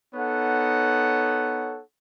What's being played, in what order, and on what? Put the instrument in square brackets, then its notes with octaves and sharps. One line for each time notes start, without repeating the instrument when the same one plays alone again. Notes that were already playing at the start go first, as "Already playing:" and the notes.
[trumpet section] B3 D#4 A4 C#5 F#5